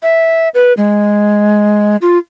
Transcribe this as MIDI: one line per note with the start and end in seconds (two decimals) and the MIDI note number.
0.03 0.49 76
0.55 0.73 71
0.77 1.96 56
2.02 2.18 65